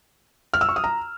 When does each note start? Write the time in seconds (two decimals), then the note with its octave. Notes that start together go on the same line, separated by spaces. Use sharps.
0.54 F6
0.61 E6
0.69 C#6
0.76 D#6
0.84 A#5